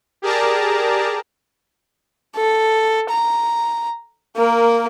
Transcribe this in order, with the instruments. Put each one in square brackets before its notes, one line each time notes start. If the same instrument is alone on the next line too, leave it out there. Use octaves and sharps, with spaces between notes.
[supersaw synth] G4 G#4 A#4 D5 A5 A#5
[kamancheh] A4
A#5
A#3 A#4